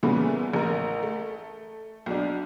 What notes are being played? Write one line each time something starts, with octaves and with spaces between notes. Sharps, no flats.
A#2 C#3 E3 G3 A3 B3
A1 A#4
A3
B1 D4